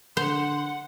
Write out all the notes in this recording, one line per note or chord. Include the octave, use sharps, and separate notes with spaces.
D3 C5 F#5 C6